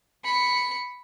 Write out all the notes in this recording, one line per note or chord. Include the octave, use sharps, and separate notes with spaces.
B5 C#7